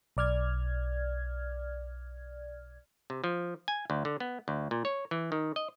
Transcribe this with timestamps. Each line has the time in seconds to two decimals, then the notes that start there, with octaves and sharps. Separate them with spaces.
0.17 B1 D5 F6 G#6
3.10 C3
3.24 F3
3.68 G#5
3.90 D2
4.05 D3
4.20 B3
4.48 D2
4.71 A#2
4.85 C#5
5.11 E3
5.32 D#3
5.56 D#5